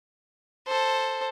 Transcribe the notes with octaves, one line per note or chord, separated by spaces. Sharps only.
A4 C5